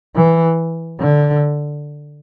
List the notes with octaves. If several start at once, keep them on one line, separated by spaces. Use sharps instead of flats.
E3
D3